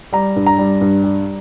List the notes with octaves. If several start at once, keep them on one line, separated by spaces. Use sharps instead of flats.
G3 A#5
G2
A#5
G3
G2
G3